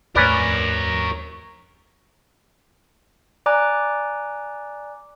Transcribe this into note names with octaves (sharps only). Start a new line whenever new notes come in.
D#2 G#2 A3 C#4 A#4 B4 C#5 D5
D5 G#5 A#5 D6 F#6